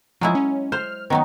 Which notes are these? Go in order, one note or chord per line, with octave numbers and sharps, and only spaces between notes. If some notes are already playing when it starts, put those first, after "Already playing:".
F3 F#3 G#3 E4
C#4
C5 F6
D#3 F#3 B3 D#4